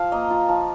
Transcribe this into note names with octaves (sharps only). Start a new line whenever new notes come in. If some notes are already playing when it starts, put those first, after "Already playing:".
Already playing: F3 F4 F5
A#3 D#5
F4
F3